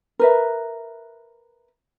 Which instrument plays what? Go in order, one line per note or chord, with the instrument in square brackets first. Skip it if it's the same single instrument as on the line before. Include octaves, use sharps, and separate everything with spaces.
[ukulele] A#4 B4 E5